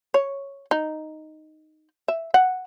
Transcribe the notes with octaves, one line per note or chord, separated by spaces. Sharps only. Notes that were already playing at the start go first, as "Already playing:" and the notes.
C#5
D#4
E5
F#5